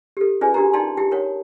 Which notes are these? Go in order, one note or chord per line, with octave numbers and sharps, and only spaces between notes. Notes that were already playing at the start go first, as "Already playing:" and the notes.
G4 A4
C#4 F4 G#4 B4 D5 G#5
D4 F#4 G4 A#4 A#5
D#4 D5 G5 A5 C6
E4 G4 G5
A#4 C#5 F#5